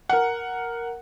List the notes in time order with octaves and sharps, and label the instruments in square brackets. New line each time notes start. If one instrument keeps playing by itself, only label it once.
[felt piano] A#4 F#5